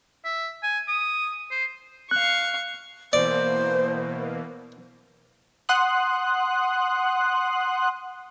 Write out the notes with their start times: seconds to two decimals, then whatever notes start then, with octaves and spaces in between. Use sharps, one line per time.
0.25 E5
0.63 G#5
0.88 D#6
1.51 C5
2.11 F5 C#6 F#6
3.13 B2 E3 A#3 C5 D5
5.69 F#5 C6 D#6 F#6